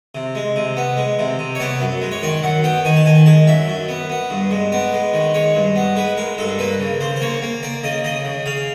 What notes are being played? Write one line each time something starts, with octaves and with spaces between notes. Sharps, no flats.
C3
G#3
C3
B3
G#3
C3
C3
C#5
B3 D5
F#2
G#3
C#5
D#3 D5
F#2 F#5
B3 G5
D#3 G#5
A5
D#3 G#5
G#3 A5
F#2 E5
F#2
B3
B3
G2
G#3
B3 D5
G#3
D#3
G#3 C#5
G2
B3
G#3 B4
G#3 A#4
G2 A4
A#3 B4
C#3
C#3 C5
C5
A#3 C#5
A#3
A#3 D5
C#3 D#5
C#3 D#5
C#3
C#3 F5